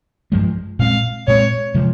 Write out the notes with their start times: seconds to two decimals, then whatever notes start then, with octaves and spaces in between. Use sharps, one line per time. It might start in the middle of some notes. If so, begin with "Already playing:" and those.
0.32 G2 F3 G#3
0.79 A#2 G#3 C4 F5
1.27 A#2 G#3 C4 C#5
1.74 C3 F3 G#3